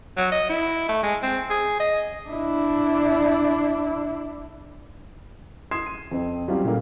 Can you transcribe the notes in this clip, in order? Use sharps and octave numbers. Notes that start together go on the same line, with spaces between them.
F#3
D#5
E4
A3
G#3
C4
G#4
D#5
D4 E4
C6 D#6 G#6 C7 E7
D#7
F2 C4
F#3 G3 C4 C#4 F4 G4
A#2 C#3 G3 A3 A#3